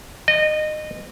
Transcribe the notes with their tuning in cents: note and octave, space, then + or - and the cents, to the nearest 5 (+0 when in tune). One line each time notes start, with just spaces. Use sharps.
D#5 -25